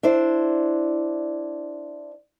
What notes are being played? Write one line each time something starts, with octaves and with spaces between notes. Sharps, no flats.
D4 E4 C5